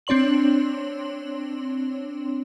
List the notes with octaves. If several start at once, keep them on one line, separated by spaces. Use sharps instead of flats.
C4 D4 C#5 C6 F#7